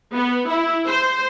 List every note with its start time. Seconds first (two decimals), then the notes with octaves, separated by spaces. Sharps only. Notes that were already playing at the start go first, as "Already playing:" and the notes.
0.14 B3
0.48 E4
0.87 C5